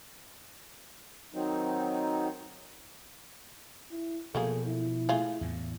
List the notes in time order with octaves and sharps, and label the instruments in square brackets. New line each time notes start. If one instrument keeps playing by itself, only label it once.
[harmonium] D#3 F#3 C4 D#4
[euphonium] E4
[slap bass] B2 F3 [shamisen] F#3 A#3 G#4 [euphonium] A4
[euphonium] E4
[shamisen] A3 F4 G#4
[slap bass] E2 A2